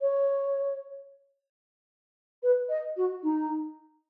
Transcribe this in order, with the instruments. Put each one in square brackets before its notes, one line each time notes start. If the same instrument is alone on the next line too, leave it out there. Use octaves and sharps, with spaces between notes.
[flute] C#5
B4
D#5
F#4
D#4